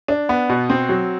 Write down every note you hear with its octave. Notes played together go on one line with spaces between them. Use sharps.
D4
B3
B2
C4
F#3